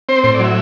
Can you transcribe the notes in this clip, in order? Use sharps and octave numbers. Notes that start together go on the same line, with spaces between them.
C4 C5
A2 C5
D5
F#3 E5